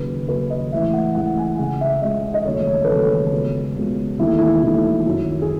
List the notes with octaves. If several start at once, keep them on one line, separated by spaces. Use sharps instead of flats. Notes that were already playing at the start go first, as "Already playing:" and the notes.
Already playing: D#2 C#3 F#3 B4
D#2 C#3 F#3 B4
D#5
A1 A2 E3 G#3 E5
F#5
A1 A2 E3 G#3 F#5
G#5
C#2 C#3 G#3 F#5
E5
C#2 C#3 G#3 D#5
D#5
E1 D#2 C#3 F#3 A3 C#5
B4
E1 D#2 C#3 F#3 A3 A4
C#2 B2 G#3
C#2 B2 G#3
E1 D#2 D#3 A3 E4
E4
E1 D#2 D#3 A3
F#2 D#3 F#3
G#4